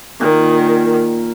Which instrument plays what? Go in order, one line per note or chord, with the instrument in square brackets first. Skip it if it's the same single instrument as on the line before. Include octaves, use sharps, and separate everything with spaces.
[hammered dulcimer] A#2 [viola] D#3